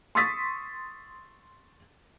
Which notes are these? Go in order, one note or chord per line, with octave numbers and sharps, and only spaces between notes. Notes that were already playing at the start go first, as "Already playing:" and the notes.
C6 C#6 D#6 E6 A6 B6